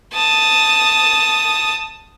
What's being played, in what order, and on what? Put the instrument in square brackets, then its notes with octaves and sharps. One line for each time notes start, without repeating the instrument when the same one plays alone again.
[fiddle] A5 D#6